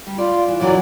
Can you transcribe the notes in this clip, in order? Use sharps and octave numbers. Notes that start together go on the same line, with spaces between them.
G3
F4 D5
E3
F#2 C#3 E3 F#3 D5